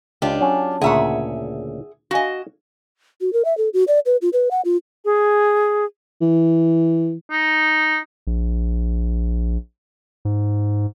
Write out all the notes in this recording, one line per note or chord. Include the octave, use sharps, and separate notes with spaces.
C#2 D4 F4 G4
F#3 C#4
D2 A#2 C#3 G#4 E5 F#5
F#4 D#5 F5 G#5
F#4
A#4
E5
A4
F#4
D5
B4
F4
B4
F#5
F4
G#4
E3
D#4
A#1
G#2